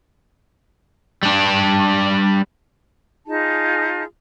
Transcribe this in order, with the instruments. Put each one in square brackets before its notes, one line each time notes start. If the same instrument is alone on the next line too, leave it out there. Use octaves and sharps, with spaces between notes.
[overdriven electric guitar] G3 D4
[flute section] D#4 F4 G#4 A5